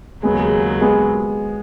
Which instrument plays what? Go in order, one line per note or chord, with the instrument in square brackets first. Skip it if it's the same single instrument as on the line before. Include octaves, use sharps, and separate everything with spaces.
[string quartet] D#2 C#3 F#3 [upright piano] G#3 B3
[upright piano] G#3 B3